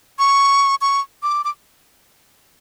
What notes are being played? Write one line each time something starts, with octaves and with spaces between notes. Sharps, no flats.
C#6
C#6
D6
D6